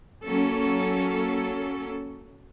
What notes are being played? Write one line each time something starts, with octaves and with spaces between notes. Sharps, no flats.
F#3 A#3 C#4 A4